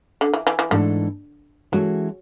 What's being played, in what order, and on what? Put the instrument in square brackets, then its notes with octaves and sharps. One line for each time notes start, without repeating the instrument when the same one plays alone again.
[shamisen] D3
E3
E3
E3
[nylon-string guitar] G#2 E3 A3 D4 A4 [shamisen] D3
[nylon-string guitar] E3 G#3 C#4 F#4 A4 [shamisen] F#3